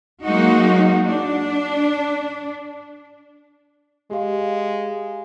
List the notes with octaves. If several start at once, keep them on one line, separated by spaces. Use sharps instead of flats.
F#3 G#3 A#3 D#4 F#4
D4
G#3 G4 F5